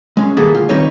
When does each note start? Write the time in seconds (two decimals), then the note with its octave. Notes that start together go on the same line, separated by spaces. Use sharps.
0.17 G#3 C#4
0.37 D#3 G3 A#3 B3 G#4 A4
0.54 D2 F4
0.69 D#3 G3 C4 D#4 B4 C#5